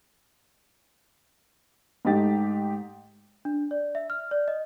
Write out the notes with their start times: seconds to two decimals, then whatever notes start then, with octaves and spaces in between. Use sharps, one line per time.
2.05 G#2 A3 D#4 G4 A6
3.45 D4
3.71 D5
3.95 E5
4.10 F6
4.31 D5
4.48 D#5